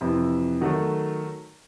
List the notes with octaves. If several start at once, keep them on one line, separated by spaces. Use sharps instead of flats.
F2 C3 E3
D#3 F#3 A3